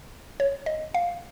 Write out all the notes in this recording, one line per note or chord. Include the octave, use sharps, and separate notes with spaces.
C#5
D#5
F5